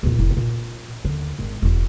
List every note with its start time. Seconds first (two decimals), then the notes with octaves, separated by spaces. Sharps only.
0.03 E2 A#2
0.18 F1 E4
0.37 A#2
1.04 D#2 D3
1.39 G#1 G#3
1.62 E1 E2